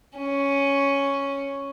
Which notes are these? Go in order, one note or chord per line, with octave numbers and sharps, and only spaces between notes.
C#4